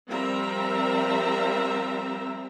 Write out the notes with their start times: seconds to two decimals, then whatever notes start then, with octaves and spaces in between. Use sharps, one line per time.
0.10 F3 G3 C4 A#4 E5 A#5